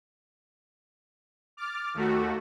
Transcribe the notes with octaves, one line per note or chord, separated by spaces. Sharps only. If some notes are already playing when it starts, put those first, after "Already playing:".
D6 F6 A6
D#2 A3 F#4